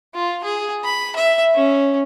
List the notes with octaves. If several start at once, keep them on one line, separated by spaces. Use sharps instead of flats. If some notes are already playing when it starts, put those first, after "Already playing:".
F4
G#4
B5
E5
C#4